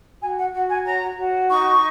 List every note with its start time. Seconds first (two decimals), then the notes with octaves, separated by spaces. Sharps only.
0.20 F#4 G#5
0.37 F#5
0.52 F#4 F#5
0.69 G#5
0.85 C#5 A#5
1.17 F#4
1.49 D#4 C#6